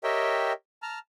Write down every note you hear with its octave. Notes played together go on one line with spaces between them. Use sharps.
G4 A#4 C#5 D#5 E5 G5
A5 A#5 F6